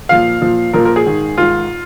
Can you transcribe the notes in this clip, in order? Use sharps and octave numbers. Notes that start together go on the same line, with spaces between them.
A#2 F3 F5
A#2 F3
A#2 F3 A#4
A#4
G#4
G#2 D#3
G#2 D#3 F4